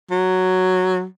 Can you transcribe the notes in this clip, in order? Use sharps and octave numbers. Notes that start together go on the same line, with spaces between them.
F#3